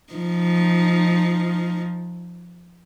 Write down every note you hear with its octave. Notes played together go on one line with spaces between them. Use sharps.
F3 D#4